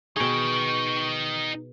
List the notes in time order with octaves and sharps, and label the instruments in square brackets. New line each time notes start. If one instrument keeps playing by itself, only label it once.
[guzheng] B2 G#4 [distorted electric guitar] D#4 G5 [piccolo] C#6